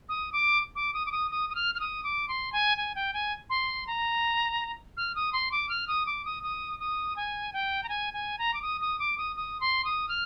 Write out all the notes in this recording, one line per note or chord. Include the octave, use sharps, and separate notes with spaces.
D#6
D6
D6
D#6
D6
D#6
D#6
D#6
F6
F6
D#6
D6
C6
G#5
G#5
G5
G#5
C6
A#5
F6
D#6
C6
D6
F6
D#6
D6
D#6
D#6
D#6
G#5
G5
A#5
G#5
G#5
A#5
D6
D#6
D#6
D6
D#6
D#6
C6
D#6
F6